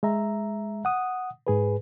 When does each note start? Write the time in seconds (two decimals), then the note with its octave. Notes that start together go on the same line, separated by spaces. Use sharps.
0.03 G#3 E5 A#5
0.85 F#5 D#6
1.47 G#2 G#4 B4